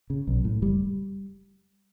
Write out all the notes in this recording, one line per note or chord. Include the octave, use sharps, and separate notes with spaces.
C#3
B1
A2
F#1 G3